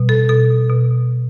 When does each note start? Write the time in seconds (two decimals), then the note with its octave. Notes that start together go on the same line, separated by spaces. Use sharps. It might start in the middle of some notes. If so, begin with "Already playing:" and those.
Already playing: B2 G3
0.09 A4
0.29 B2 A4
0.70 B2